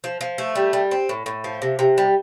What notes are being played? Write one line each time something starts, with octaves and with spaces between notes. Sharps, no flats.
F3
F3
A3
G3
G3
C4
A2
A2
F3
C3
C3
G3